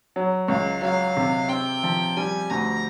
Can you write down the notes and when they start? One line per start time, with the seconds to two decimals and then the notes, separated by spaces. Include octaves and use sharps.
0.16 F#3
0.48 C#2 F5
0.82 F#3 F5
1.17 C3
1.49 C4 G5
1.83 F3
2.17 G3 G#5
2.50 D2 A#5